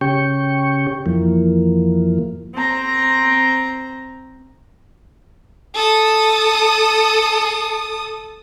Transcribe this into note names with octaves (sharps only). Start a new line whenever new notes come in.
C#3 C#4 G4 G5 C#6
F2 E3 F3 A#3
C4 A#5
A4 D#6